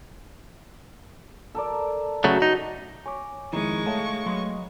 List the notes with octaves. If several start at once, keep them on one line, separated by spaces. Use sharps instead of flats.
A4 A#4 D5
C#3 F#3 A3 F#4
D#4
C#5 G#5 D6
F2 D#3 G#3 D#4 E4 C#6
A3 C#5 F5 G5 A5
F#3 B4 D#5 C6